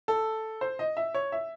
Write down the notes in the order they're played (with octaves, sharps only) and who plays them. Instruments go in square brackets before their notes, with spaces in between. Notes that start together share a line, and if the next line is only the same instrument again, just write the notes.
[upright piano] A4
C5
D#5
E5
C#5
E5